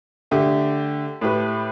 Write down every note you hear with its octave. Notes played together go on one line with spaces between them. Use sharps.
D3 A3 G4
A2 A3 G4 B4